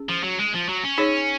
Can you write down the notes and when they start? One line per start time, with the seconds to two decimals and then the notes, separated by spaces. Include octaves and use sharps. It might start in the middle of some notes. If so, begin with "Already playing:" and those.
Already playing: C#4 G#4
0.09 F3
0.23 F#3
0.39 G#3
0.54 F3
0.68 F#3
0.84 C#4
0.98 D#4 G#4 C#5